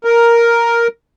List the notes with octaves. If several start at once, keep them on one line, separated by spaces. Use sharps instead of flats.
A#4